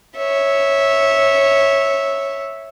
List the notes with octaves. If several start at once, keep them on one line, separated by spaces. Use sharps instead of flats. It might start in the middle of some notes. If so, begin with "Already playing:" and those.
C#5 E5